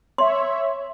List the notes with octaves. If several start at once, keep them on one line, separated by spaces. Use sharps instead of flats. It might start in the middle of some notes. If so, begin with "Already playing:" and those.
C#5 E5 C6